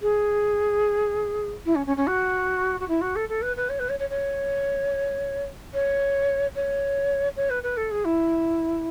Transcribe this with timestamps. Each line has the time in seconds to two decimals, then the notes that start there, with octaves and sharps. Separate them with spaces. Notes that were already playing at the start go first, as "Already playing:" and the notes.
0.02 G#4
1.65 E4
1.75 C#4
1.86 C#4
1.97 C#4
2.07 F#4
2.80 F#4
2.88 E4
3.01 F#4
3.16 A4
3.29 A4
3.42 B4
3.56 B4
3.69 C#5
3.79 B4
3.89 C#5
3.99 C#5
4.09 C#5
5.73 C#5
6.55 C#5
7.36 C#5
7.50 B4
7.63 B4
7.77 A4
7.91 G#4
8.05 E4